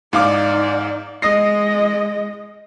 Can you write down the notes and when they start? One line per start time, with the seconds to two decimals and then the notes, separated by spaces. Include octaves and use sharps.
0.13 G#2 D#4 D5 F5 D6
1.22 G#3 D#5 D#6 A#6 C7